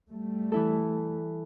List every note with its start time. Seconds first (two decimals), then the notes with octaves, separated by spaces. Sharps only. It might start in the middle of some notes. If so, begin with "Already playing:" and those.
0.10 G3 A3
0.52 E3 E4 A4